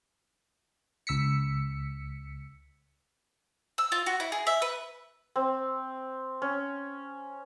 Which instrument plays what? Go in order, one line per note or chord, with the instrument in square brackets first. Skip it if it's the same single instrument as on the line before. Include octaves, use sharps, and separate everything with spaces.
[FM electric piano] C#2 E6 B6 C#7
[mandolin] E6
F4
F#4
E4
G#4
E5
B4
[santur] C4
C#4